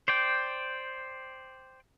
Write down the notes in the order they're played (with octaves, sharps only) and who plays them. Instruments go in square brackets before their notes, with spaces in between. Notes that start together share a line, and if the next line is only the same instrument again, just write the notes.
[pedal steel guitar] C5 D5 G5